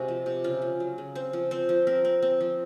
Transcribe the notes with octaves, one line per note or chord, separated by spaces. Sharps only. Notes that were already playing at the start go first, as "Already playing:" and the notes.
Already playing: C3 G#3 F#4
F3
C3
C#3 F4
C#3
F#3
C#3
C4 C5
F3
C4 C5
F3
C4 A#4
C4
C4
F3